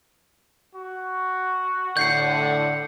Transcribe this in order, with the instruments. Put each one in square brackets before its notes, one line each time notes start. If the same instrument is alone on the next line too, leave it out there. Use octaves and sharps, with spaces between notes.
[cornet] F#4
[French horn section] A2 D3 [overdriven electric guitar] F#5 [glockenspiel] G6 C7 C#7